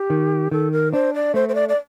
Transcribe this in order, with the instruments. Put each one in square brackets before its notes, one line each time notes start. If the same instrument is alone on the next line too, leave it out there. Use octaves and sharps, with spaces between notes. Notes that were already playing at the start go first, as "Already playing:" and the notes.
Already playing: [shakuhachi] G4
[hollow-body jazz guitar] D#3
[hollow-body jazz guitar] D#3 [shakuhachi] A4
[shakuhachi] A#4
[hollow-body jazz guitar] D4 [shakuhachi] C5
[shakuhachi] D5
[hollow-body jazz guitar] A3 [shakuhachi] C5
[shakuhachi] C5
D5
D5